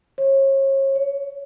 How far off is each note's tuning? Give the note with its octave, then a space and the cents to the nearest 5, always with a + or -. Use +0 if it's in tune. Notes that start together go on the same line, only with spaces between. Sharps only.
C#5 -35
C#5 +15